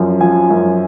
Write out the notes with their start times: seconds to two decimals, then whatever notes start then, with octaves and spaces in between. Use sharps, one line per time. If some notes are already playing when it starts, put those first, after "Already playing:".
Already playing: F#2 F3
0.21 F3 G#5
0.51 F#2